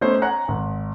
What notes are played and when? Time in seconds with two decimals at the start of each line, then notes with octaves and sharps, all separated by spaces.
0.01 A3 B3 C#4 D#4 C5 C#5
0.22 C#5 F#5 G#5 A#5 F#6
0.48 G#1